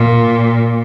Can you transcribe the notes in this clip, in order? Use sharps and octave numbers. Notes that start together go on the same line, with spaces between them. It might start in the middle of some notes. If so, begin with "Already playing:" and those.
Already playing: A#2